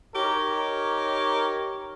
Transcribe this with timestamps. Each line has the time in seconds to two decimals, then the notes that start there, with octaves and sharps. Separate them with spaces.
0.15 D#4 G4 A#4 C#5